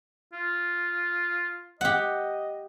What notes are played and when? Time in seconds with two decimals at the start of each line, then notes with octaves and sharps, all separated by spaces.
0.33 F4
1.81 G4 D#5 F#5